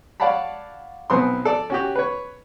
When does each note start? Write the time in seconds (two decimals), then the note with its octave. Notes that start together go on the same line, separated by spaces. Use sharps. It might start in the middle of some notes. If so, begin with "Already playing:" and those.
0.20 C#5 D5 F5 F#5 A5 B5
1.10 B1 B3 C4 G#5 C6
1.45 A4 D5
1.70 C#4 F#4 G4
1.95 B4 C#5